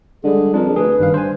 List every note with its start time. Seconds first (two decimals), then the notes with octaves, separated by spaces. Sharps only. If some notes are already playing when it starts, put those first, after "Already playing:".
0.24 D3 G3 G#3 G#4
0.54 F2 D4 A#4
0.76 D2 G#4 B4
0.99 G1 G2 D#3 F5
1.14 C5 G#5